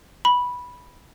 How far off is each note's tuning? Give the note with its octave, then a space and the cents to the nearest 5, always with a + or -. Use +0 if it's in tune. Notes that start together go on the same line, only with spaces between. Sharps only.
B5 -10